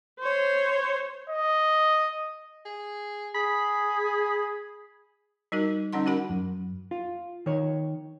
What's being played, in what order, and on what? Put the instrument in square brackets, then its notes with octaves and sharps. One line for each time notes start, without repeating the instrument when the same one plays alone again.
[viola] C5 C#5
[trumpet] D#5
[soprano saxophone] G#4
[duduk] G#4 [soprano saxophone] B5
[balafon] G3 D#4 F#4 A#4
D3 G3 C#4 D#4 F#5 C6
C#4 F#4 A#4 F#5 B5
[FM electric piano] F#2
[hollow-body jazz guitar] F4
D#3 C#5